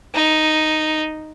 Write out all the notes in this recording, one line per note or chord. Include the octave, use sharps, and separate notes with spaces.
D#4